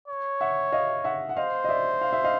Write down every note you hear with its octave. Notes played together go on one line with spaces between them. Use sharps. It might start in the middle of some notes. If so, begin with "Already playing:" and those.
C#5
E5 F#5
D#5 F5
E5 F#5
F#5
C5 D#5 F5
D#5
D5 E5
F5
E5
D#5 F5